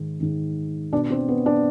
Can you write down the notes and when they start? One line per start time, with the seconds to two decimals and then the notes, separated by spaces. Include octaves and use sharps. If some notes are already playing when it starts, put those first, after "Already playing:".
Already playing: G#2 D#3
0.20 G#2 D#3
0.93 B2 D4
1.10 C4
1.29 B3
1.46 D4